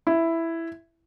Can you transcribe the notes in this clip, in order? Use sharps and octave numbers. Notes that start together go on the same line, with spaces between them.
E4